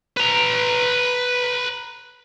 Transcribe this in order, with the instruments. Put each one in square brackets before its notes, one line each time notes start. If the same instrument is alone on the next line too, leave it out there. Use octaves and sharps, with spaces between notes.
[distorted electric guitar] B4 A#5